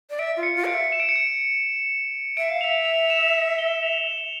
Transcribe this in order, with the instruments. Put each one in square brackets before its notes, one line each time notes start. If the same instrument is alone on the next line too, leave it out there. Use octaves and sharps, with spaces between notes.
[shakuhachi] D5
[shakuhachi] E5 [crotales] D7
[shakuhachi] F4
[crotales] C#7
[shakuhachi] F4
[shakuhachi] F5 [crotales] D7
[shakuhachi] E5
[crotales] E7
D7
C#7
D7
[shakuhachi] E5 [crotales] D7
[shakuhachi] F5
[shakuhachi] E5 [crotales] F7
[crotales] F7
E7
F7
G7
F7
F7